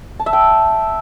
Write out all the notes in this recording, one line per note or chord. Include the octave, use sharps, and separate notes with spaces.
A5
E5
G5